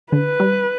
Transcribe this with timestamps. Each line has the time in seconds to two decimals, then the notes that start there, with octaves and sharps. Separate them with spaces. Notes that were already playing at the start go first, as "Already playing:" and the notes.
0.12 D3 B4
0.40 G3